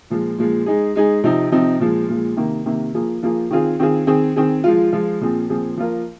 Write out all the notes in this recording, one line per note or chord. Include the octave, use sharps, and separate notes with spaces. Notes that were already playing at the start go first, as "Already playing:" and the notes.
A#2 F3 G#3
A#2 F3 G#3
G#3 D#4 G#4
G#3 D#4 G#4
C3 F3 C4 D#4
C3 F3 C4 D#4
A#2 F3 G#3
A#2 F3 G#3
C3 D#3 A#3
C3 D#3 A#3
F3 A#3 F4 G#4
F3 A#3 F4 G#4
D#3 C4 F4 G#4
D#3 C4 F4 G#4
D#3 C4 G#4
D#3 C4 G#4
F3 G#3 F4
F3 G#3 F4
A#2 F3 C4 G#4
A#2 F3 C4 G#4
F3 A#3 F4 A#4